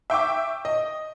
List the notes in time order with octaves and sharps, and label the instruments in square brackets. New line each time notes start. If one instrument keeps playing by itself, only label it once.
[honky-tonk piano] E5 G5 C#6 D6
D#5